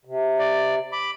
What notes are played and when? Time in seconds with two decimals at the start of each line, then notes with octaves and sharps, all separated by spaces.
0.05 C3
0.39 D5
0.92 B5 D6